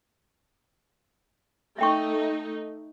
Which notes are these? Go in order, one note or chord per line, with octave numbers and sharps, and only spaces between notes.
A3 D#4 E5 G5 C#6